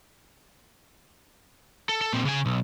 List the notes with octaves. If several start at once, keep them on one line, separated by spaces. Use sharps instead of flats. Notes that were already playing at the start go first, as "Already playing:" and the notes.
A4
A4
A#2 C4
C#3 G#5
B1